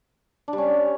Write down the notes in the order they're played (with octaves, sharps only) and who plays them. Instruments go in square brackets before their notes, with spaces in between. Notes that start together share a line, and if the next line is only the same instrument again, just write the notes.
[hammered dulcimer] D4
G3
C#4